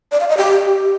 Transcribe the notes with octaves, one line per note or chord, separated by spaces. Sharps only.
D5
F5
D#5
G4